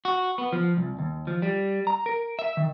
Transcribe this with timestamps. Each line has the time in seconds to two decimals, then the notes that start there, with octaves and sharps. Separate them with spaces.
0.05 F#4
0.38 B3
0.52 F3
0.77 C2
0.99 D#2
1.27 F3
1.42 G3
1.87 A#5
2.06 A#4
2.39 E5
2.57 D#3